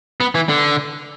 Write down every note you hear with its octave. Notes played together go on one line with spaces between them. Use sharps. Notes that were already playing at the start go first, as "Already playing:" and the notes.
B3
E3
D3